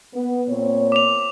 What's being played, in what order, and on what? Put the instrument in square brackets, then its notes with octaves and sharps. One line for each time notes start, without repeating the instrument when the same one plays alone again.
[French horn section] B3
A#2 C4 C#5
[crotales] D6 F7